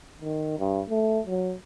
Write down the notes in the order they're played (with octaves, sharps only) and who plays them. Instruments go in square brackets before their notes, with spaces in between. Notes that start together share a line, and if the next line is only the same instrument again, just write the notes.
[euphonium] D#3
G2
A3
F#3